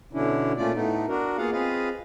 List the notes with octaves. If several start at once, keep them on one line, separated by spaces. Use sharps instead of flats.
B2 D3 C#4 D4 E4
A#2 A3 C#4 F4 D5
A2 A3 B3 D#4
D4 F#4 A#4
A#3 B3 F4 G#4 F5 F#5
C4 F4 G#4 B4 D#5 F5